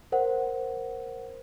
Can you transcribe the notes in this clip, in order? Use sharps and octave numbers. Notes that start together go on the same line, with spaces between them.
A#4 C5 F#5